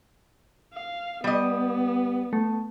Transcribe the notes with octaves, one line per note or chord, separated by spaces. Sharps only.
F5
G3 B3 D#5
A3